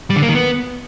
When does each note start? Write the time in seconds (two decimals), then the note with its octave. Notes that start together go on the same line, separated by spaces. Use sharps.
0.10 G3
0.16 D3
0.22 A#3
0.29 D#3
0.35 B3